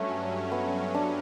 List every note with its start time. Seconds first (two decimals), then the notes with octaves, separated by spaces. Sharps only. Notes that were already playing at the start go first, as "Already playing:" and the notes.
Already playing: G2 F#3 A3 C#4
0.51 B3
0.95 D4